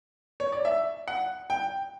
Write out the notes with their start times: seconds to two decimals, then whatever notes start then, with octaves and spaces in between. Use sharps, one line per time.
0.40 C#5
0.52 D5
0.65 E5
1.08 F#5
1.50 G5